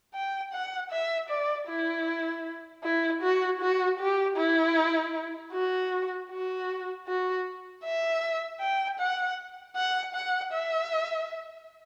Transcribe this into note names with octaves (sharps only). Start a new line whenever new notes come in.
G5
F#5
E5
D5
E4
E4
F#4
F#4
G4
E4
F#4
F#4
F#4
E5
G5
F#5
F#5
F#5
E5